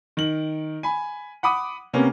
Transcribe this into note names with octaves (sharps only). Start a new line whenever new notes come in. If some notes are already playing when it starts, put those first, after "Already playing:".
D#3 F#7
G#5 B5
F#5 B5 D6 D#6
C3 A#3 B3 C#4